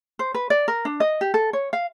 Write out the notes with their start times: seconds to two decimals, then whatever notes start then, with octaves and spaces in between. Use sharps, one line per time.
0.19 C5
0.34 B4
0.50 D5
0.68 A#4
0.85 D4
1.00 D#5
1.21 G4
1.34 A4
1.53 C#5
1.73 F5